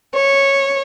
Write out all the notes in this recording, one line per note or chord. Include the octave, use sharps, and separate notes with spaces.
C#5